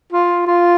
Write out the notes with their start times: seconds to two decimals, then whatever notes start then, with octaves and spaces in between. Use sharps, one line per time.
0.13 F4
0.47 F4